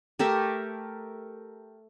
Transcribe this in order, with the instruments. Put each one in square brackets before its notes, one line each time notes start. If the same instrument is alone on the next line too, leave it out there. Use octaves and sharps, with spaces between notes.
[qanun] A3 G4 A#4 E5